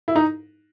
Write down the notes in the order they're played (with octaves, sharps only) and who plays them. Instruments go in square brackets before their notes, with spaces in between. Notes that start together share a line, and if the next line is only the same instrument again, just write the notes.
[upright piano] E4
D#4